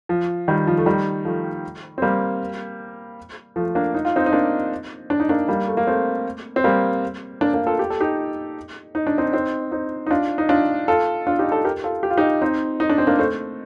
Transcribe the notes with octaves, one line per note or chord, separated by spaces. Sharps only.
F3
D#3 G3
F3
A3
D#3 G3
F3 A3
C4
G3 A#3
F3 A3
A#3 D4
D#4
F4
C4 D#4
D#4
A#3 D4
D4
D#4
A#3 D4
G3 A#3
A3
A#3
A3 C4
C4
G3 A#3
A#3 D4
A#3 D4
F4 A4
G4
A4
D#4 G4
D#4
D4
C4 D#4
C4 D#4
C4 D#4
D#4
D4 F4
D#4
D4 F4
F4 A4
D4 F4
D#4 G4
F4 A4
G4 A#4
F4 A4
G4
F4
D#4 G4
C4 D#4
D#4
D4
C4
A#3 D4
A3 C4